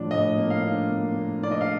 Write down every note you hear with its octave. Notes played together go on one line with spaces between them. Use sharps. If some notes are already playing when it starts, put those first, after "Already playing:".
Already playing: A2 F3 D4
A2 D#5
A#3
F5
D4
A#3
A#3
D4 D5
D#5
F5